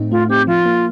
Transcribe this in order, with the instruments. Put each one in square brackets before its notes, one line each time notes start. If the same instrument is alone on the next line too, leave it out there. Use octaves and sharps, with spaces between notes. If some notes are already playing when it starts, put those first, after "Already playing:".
Already playing: [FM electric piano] A2 A3 C4 D#4
[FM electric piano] A3 [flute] F4
[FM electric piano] C4 [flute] G4
[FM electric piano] F3 [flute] F4
[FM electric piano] A#3